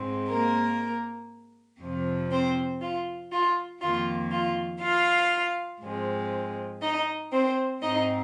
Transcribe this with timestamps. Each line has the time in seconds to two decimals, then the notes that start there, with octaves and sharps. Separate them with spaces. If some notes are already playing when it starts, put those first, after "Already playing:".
Already playing: G#2 G#3 C4
0.31 A#3 A#4
1.81 F2 C3 F3
2.31 C4 C5
2.81 F4
3.31 F4
3.82 F2 D#3 A#3 F4
4.32 F4
4.82 F4 F5
5.82 G#2 F3 G#3 C4
6.82 D#4 D#5
7.32 C4 C5
7.82 G#2 G#3 C4 D#4 D#5